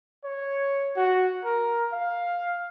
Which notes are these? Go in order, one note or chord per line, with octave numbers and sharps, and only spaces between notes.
C#5
F#4
A#4
F5